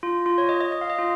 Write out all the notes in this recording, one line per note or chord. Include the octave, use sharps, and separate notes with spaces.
F4
F4
C#5
D#5
D#5
D#5
F5
D#5
F4